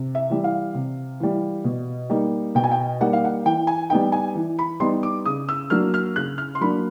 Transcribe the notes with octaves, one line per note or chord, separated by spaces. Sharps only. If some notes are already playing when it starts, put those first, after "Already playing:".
Already playing: C3
E5
E3 G3
F5
C3
E3 G3
B2
G3 A#3 D#4
B2 G5
G#5
G5
G3 A#3 D#4 F#5
F5
F#5
E3 G5
G#5
G3 B3 D#4 G5
G#5
E3
B5
G3 B3 D#4 C6
D6
C#3 D#6
E6
F#3 A#3 D4 F6
F6
C#3 F#6
F6
C6
F#3 A#3 D4 B5